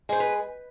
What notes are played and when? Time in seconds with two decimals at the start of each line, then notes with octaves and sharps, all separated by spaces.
0.09 G#3 C5
0.20 B4